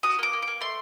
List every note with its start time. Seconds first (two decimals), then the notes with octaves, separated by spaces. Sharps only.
0.03 F#4 D#6
0.19 A#3 D6
0.33 A#3
0.42 D6
0.48 A#3
0.61 A3 C6